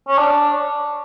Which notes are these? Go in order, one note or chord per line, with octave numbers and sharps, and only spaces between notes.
C#4
D4